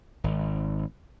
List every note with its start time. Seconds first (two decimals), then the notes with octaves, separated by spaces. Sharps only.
0.24 G#1